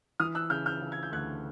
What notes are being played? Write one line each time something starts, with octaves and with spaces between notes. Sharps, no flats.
E3 D#6 F6
E6 F#6
C#3 F6 G6
F6 G6
C#3
G#6
G6
D2 F#6 G#6